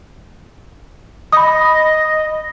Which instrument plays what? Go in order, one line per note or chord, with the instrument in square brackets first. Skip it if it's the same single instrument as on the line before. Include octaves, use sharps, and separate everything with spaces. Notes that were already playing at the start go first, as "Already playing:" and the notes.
[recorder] D#5 [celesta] B5 D#6